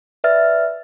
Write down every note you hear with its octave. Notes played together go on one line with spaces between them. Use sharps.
B4 D5 E5 F6 A6